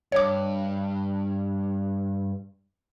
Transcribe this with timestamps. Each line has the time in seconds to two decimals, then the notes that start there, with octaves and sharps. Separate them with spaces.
0.12 G2 C#5 D6